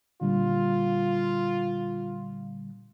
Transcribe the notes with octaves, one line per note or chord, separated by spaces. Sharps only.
A#2 D3 G3 F4